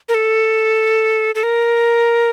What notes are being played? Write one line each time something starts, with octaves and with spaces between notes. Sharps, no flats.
A#4
A4
A4
A#4